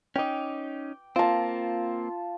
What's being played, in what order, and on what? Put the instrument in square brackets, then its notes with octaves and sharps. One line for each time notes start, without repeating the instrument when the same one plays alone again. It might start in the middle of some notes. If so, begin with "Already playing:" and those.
[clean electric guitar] C#4 D#4 [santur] G5 D6
[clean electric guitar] A#3 C4 [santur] F4 A5